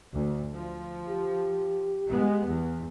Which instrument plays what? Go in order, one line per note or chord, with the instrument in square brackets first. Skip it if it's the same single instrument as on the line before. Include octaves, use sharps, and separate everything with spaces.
[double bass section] D2
F3
[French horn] G4
[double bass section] G#3 B3
E2